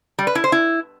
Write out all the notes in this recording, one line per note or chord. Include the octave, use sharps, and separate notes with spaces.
G3
B4
E4
C5
E4